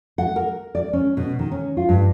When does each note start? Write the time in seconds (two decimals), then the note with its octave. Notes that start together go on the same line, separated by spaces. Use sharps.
0.18 F#5
0.36 A#4
0.75 D5
0.93 C#4
1.17 B2
1.39 D#3
1.52 C#4
1.77 F4
1.89 G2